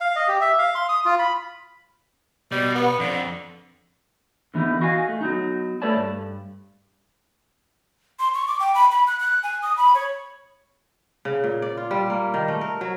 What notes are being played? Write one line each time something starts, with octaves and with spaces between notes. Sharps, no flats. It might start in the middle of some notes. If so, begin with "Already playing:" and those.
F5
D#5
G4
E5
F5
C6
D#6
F4
B5
B2 G3
B3
F2 D3
D3 E3 B3 D#4 E4
F#4 D#5 F5 G#5
A3
F#3 B3 D#4
A3 A4 B4 C#5 D5 A5
G2
C6
C#6
D6
G5
B5
B5
F#6
F#6
G#5
D#6
B5
C#5
C#3
A#2
D5
F4
G3
A#3
D#3
A3
A#4
F#3